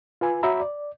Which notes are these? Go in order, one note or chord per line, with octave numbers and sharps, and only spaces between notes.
F4 B4 G#5
F#4 C#5 E5 A#5 B5
D5